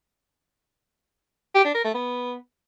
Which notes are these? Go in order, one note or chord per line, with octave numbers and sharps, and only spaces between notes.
G4
D4
A#4
A3
B3